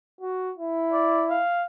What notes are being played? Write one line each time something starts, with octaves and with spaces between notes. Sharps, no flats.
F#4
E4
D5
F5